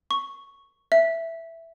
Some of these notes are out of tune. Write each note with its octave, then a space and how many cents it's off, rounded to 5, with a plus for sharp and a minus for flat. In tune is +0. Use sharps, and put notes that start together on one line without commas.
C#6 +0
E5 +5